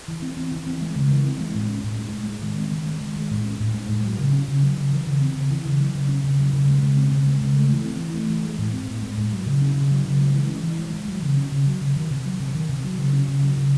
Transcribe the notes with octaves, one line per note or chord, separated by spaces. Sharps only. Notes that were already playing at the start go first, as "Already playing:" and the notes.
E3
C4
C4
E3
C4
G#3
C#3
E3
C4
G#3
A2
C#4
A2
G#3
A2
G#3
D#3
C4
D#3
G#3
D#3
G#3
A2
C#4
A2
G#3
A2
F#3
C#3
C#4
C#3
F#3
C#3
E3
C#3
C4
C#3
E3
C#3
F#3
C#3
C#4
C#3
F#3
C#3
G#3
C#3
C4
C#3
G#3
C#3
A3
E3
C4
E3
A3
E3
G#3
A2
C4
A2
G#3
A2
F#3
C#3
C#4
C#3
F#3
C#3
G#3
E3
C#4
E3
G#3
E3
F#3
C#3
C#4
C#3
F#3
C#3
D#3
C3
F#3
C3
D#3
C3
F#3
C#3
C#4
C#3
F#3
C#3